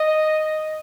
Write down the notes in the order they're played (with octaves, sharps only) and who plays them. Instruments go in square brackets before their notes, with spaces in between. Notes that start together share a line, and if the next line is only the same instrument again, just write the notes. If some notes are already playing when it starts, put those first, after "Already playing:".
Already playing: [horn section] D#5